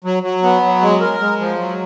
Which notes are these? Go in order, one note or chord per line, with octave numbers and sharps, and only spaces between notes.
F#3
F#3
B3
F#3
G#3
A#4
G#3
F3
F#3